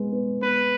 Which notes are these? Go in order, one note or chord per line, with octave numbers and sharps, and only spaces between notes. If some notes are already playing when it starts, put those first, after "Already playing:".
Already playing: G#3 B3
B3
B3 B4